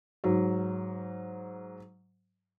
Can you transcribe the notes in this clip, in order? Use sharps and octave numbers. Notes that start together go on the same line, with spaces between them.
G#2 F#3